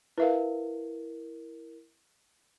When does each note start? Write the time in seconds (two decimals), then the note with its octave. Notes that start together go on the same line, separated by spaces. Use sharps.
0.18 E4 A#4 B4 E5 F5